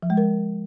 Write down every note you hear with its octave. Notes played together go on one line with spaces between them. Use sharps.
F3
G#3
A#4